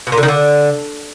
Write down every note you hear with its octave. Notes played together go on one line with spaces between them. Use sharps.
B2
A#2
D3
D#3
D3